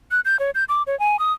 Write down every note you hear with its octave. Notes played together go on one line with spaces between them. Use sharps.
F#6
G6
C#5
G6
D6
C#5
G#5
D#6